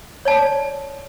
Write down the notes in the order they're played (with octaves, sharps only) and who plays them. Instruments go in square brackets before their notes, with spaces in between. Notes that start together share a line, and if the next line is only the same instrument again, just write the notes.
[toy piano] C#5 D5 A5